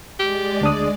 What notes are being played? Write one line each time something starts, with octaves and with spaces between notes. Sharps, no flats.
G#3 G4 D5
D2 D4 D#6